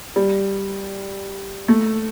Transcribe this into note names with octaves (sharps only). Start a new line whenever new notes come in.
G3
A3